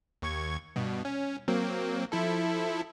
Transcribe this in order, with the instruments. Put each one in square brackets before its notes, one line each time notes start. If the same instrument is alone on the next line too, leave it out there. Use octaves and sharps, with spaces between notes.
[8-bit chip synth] D#2 C#6 G#6
G2 B2
C#4
F#3 A#3 C4
F3 E4 A4